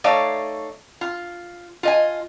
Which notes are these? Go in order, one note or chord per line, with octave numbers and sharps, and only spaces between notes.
A3 D#4 C#5 D5 F5
F4
F4 D#5 G#5